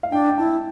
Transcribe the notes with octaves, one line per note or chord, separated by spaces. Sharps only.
F5
D4 G5
G5
E4 A5